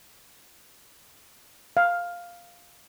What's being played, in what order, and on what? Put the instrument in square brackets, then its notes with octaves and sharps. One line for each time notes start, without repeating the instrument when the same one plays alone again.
[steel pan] F5